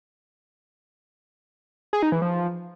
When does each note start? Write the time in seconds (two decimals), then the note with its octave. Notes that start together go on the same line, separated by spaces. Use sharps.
1.93 G#4
2.03 D#4
2.12 E3
2.22 F3